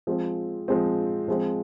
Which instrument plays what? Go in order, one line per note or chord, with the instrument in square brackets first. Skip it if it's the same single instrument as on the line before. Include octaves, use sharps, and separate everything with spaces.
[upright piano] F3 G#3 C4
F3 G#3 C4
F3 G#3 C4